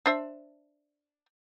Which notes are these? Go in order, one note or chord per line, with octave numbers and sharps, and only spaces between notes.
D4 C5 E5